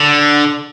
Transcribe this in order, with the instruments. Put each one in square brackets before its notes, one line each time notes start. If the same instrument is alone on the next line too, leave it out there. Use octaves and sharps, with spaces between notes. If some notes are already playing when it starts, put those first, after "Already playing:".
Already playing: [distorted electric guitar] D3